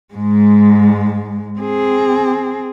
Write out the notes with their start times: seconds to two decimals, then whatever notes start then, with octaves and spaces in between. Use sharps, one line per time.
0.14 G#2 G#3
1.60 C4 G#4